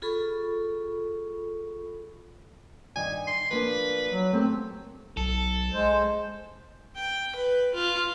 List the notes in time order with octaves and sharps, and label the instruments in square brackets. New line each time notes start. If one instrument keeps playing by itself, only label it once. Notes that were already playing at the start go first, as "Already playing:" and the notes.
[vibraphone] F4 G#4 A4 B5 C#6
[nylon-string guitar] G2 D#3 [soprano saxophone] G#5
[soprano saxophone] C6
[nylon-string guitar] F3 A#3 D4 [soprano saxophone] B4
[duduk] F#3
[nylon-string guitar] A3 A#3 G4 [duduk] C4
[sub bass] B1 [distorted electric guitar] A4
[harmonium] G#3 C5
[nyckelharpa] G5
B4
F4